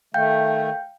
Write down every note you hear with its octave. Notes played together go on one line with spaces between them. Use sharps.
D#3 A3 F5 G5 G6